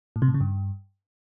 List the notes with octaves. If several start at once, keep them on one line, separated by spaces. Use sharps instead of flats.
A2
C3
A2
C#3
G2